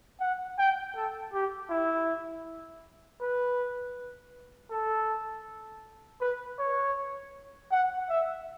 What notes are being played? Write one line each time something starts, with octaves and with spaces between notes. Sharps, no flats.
F#5
G5
A4
G4
E4
B4
A4
B4
C#5
F#5
E5